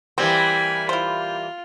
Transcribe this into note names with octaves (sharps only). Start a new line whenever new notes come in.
E3 G3 A#3 C4 G#5 B5
E4 F4 C5